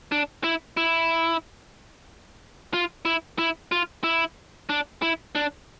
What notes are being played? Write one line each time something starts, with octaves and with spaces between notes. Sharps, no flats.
D4
E4
E4
F4
E4
E4
F4
E4
D4
E4
D4